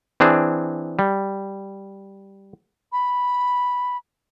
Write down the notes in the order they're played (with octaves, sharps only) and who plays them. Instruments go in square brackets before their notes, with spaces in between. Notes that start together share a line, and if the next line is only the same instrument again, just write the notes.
[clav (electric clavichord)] E3 C4 D4 G#4
G3
[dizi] B5